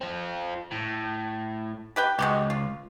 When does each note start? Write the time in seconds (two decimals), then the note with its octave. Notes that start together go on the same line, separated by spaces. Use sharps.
0.01 C4 F4
0.71 A2
1.96 G4 B4 G5
2.19 C#2 G#3 F#4 G4
2.50 F4